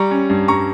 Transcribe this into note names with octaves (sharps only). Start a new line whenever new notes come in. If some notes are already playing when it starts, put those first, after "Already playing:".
Already playing: G3 A#5 C#6
C#4
G2
G2 A#5 C#6